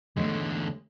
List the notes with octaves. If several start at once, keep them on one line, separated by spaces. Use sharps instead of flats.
E2 D3 G#3 A3 C#4